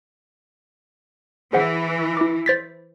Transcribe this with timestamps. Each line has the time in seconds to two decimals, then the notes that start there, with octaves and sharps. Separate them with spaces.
1.53 E3 G#4 C5 F#5
2.17 E4 D6
2.46 C5 A6 B6